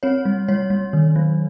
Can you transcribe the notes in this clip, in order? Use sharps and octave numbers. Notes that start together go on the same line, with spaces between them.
C4 C#5
G3
G3 C#5
G3
D#3
F#3